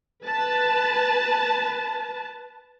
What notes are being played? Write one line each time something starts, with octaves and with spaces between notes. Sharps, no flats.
B4 A5